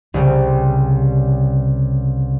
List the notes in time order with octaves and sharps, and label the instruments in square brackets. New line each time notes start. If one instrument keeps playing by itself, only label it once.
[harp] C2 C#3 G3